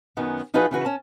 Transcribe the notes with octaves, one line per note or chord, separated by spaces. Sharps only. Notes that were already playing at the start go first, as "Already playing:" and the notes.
F#2 D#3 F#3 B3 C#4
F3 D#4 F4 F#4 G#4 B4
C#3 E3 F#4 B4
C#4 A5